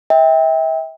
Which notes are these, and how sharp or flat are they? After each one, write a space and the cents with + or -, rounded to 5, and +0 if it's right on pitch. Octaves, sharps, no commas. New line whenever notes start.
E5 -35 G5 +20